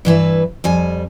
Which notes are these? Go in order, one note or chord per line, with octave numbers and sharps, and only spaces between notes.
G2 E3 E4 B4
F2 G3 G#5